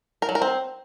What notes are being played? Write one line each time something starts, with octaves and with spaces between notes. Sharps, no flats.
A#4
F#3
A#4
C4